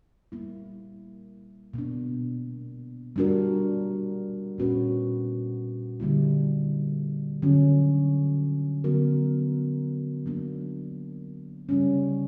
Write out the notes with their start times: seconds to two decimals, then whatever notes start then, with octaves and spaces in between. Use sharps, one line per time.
0.32 G3 A#3 E4
1.74 B2 A#3 D4
3.16 G3 A#3 D4 F#4 A#4
4.58 A#2 A#3 C#4 F#4 B4
6.00 D3 G3 A#3 E4
7.42 D3 F#3 C#4
8.84 D3 F#3 B3 F#4 A#4
10.26 F#3 A#3 D4
11.69 C#3 G3 C#4